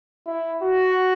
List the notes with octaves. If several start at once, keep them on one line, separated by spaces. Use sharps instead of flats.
E4
F#4